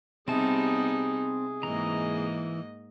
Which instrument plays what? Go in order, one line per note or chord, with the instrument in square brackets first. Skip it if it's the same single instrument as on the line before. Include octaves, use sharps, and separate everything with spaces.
[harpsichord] C3 [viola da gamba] G3 B3 D#4 [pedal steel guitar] C4 A5 [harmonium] G#4
[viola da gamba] G#2 A#3 D#5 [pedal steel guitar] E3 A#5